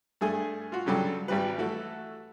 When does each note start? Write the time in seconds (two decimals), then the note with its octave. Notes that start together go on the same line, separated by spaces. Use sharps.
0.21 G2 A3 G#4 G#5
0.72 F4 F#4
0.86 G2 C#3 F#3 G3 A4
1.28 G#1 G3 G4 B4
1.58 E3 A3 F#4 A4